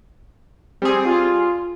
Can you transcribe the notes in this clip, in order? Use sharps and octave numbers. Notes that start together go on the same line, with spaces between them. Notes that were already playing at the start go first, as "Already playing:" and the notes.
G3 C4 G#4
F4